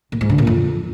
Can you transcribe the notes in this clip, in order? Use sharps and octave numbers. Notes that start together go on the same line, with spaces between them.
A#2
G#2
D3
A#2
F2